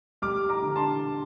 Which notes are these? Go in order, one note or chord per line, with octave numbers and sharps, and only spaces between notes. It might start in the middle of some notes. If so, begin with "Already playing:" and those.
G3 D6 F6
A#5 D6
D3
A5 C6